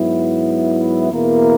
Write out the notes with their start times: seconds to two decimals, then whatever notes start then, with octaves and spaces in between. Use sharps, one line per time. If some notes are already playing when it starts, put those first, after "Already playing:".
Already playing: G#2 F#3 B3 E4
1.10 E2 B2 A#3 E4 A#4